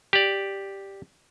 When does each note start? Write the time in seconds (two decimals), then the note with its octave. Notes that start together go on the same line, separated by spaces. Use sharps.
0.13 G4 D5